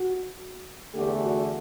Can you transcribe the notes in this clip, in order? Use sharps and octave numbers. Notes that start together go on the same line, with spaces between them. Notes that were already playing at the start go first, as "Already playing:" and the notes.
Already playing: F#4
E2 D3 A3 G4
F#4